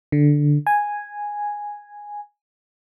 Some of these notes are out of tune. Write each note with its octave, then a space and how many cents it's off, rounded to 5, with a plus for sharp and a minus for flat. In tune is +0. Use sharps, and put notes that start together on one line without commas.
D3 +0
G#5 -5